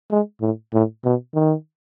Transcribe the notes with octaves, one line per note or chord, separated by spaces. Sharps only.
G#3
A2
A2
B2
D#3